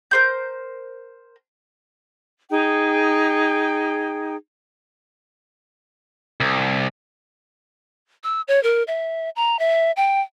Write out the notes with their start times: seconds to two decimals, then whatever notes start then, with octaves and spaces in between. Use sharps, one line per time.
0.11 A#4 C5 G6
2.50 D#4 G#4 G5
6.40 C2
8.24 E6
8.48 C#5
8.63 A#4
8.87 E5
9.36 A#5
9.59 E5
9.97 G5